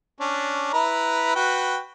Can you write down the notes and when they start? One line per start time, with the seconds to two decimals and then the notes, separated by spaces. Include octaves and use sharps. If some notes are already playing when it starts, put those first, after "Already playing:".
0.21 C#4 D4
0.74 E4 B4 A#5
1.35 F#4 B4 G5